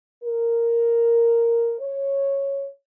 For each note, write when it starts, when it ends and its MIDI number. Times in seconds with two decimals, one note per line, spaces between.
0.23 1.74 70
1.80 2.67 73